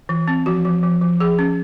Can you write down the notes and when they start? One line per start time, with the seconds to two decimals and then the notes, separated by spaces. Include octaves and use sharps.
0.09 E3
0.28 C4
0.46 F3 F#4
0.65 F3
0.83 F3
1.02 F3
1.20 F3 G#4
1.39 C#4